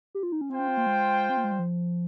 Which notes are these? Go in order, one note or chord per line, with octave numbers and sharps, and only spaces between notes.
G4
F4
D#4
C#4
C4 F4 C5 G5
C#4
C4
A#3
G#3
C4
A#3
G#3
G3
F3